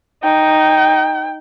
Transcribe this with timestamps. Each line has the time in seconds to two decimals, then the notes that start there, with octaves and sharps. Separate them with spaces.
0.23 D#4 G5